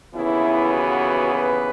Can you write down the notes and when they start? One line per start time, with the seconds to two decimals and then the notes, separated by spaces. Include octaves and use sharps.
0.14 D#2 C#3 E3 B3 E4
0.73 F#4
1.33 B4